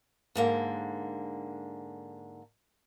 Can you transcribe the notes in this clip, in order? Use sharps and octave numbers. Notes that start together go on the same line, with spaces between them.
G#2 D3 A#3